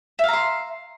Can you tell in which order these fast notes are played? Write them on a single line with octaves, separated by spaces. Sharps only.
E5 F5 A#5 C6